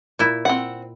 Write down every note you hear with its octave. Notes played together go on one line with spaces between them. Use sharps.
A#2 E4
C4 F#5